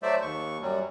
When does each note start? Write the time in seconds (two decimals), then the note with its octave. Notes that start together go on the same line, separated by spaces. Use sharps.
0.03 F#3 A3 C5 D5 E5
0.22 D#2 C#6
0.61 F#2 F#3 G3